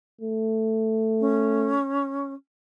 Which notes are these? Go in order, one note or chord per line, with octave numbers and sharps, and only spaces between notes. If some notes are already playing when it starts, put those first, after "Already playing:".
A3
C#4